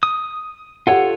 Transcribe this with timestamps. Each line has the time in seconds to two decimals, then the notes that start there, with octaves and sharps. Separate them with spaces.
0.03 D#6
0.87 F4 G4 A4 C#5 F#5